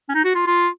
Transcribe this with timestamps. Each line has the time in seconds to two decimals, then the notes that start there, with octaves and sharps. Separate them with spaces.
0.09 C#4
0.14 D#4
0.24 F#4
0.35 F4
0.46 F4